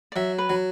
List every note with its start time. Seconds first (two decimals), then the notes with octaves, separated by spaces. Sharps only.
0.12 D5
0.16 F#3 E5
0.38 B4
0.50 F#3